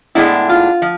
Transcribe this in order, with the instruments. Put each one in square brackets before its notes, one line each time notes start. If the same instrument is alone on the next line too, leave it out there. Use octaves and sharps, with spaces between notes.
[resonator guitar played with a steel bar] A2 G#3 B3 D4 E4
F4
F3